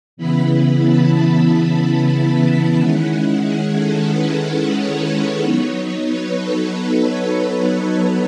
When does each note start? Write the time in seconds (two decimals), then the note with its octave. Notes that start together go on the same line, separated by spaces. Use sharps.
0.17 C#3 E3 B3 E4 B5
0.82 A5
2.78 D#3 G#3 C#4 E4 F#5
3.43 G#4
3.76 A4
4.09 B4
4.74 C#5
5.39 F#3 B3 D#4
6.04 B4
6.36 A4
6.70 B4
7.34 C#5